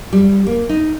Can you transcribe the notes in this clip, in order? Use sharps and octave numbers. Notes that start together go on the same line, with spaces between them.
G3
A#3
D#4